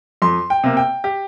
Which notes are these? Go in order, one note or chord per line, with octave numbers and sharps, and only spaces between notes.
F2 C6
G5
C3 A#3
G5
G4